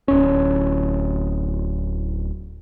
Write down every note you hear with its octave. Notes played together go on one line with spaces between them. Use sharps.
D1 C#4